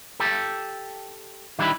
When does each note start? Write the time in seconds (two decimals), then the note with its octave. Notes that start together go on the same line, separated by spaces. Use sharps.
0.20 G4 A4
1.59 D#3 G3 D4 E4 B5